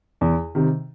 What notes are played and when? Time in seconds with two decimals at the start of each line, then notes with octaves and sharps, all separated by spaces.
0.21 E2
0.55 C3 D#3